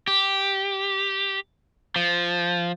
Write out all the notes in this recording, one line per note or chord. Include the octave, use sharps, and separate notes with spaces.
G4
F3